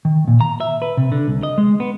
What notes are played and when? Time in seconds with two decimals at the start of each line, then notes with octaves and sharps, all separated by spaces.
0.05 D#3
0.28 A#2
0.41 A#5
0.60 E5
0.82 B4
0.97 C3
1.12 D3
1.28 C2
1.43 D#5
1.58 G#3
1.80 B3